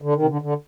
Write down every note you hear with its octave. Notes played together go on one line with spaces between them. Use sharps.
D3
D#3
C3
D3
D3